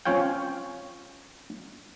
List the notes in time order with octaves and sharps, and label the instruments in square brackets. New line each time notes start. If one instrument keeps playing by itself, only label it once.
[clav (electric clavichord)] C4 C#4 F4 C#5 F5 G5